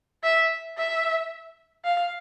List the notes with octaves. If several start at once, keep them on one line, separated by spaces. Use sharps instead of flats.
E5
E5
F5